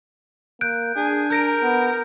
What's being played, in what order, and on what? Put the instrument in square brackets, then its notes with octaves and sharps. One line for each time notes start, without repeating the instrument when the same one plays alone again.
[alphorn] A#3 [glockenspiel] F#6 G6 D7
[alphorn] D4 [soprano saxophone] G#4
[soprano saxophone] A#4 [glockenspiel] G6 A#6 D7
[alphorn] B3